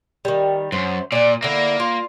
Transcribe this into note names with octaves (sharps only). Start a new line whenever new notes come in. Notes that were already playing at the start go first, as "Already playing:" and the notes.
D#3 G3
F#2 C5
A#2 D5 F#5
D3 A#3 E4
F4